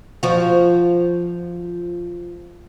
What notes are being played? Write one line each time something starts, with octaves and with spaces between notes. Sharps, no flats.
F3 F#4